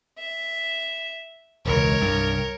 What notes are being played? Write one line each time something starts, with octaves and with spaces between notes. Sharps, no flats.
E5
E1 C#2 A#4 C#5
C2 G2